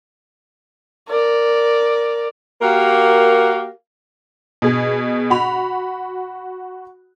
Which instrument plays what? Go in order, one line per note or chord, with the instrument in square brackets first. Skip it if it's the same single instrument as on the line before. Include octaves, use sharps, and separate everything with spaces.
[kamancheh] A#4 D5
[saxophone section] A#3 F#4 G4 A#4 F5
[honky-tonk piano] B2 G#4
F#4 B5 F7